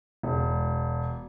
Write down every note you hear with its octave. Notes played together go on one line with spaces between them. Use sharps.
E1